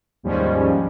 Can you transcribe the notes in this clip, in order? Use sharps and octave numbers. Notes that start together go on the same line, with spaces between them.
D#2 G#2 F3 G3 G#3 C#4